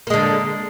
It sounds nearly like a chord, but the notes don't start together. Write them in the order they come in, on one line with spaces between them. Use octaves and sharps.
A#3 G#3 D3